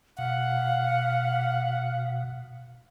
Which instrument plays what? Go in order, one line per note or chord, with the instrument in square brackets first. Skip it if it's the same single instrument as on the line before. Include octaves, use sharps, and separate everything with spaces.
[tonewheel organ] B2 [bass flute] F5 [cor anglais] F#5